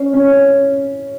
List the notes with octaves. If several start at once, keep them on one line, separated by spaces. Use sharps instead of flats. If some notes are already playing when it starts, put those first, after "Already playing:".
Already playing: C#4
C#4